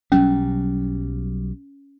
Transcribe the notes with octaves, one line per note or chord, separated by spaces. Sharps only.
B1 F#3 G3 C#4